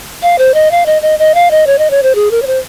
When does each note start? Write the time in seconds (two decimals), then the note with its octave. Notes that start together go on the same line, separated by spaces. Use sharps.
0.22 F5
0.38 C5
0.54 D#5
0.71 F5
0.86 D#5
1.02 D#5
1.19 D#5
1.34 F5
1.51 D#5
1.67 C#5
1.78 D#5
1.90 C#5
2.03 C5
2.15 G#4
2.31 A#4
2.42 C#5
2.47 C5